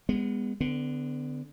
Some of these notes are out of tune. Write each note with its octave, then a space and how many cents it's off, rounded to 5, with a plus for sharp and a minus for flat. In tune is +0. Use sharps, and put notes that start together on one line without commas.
G#3 -30 B3 +0
D3 +0 B3 +35